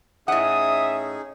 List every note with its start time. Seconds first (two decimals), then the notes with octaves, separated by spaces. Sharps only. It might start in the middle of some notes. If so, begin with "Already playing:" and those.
0.28 A2 C#4 D#4 G#4 E5 F#5 D#6